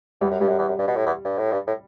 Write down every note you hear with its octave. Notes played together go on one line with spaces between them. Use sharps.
E2 G3
F#2
G2 G3
F#2
E2
F#2
G2
B2
A2
E2
G2
A2
G2
A2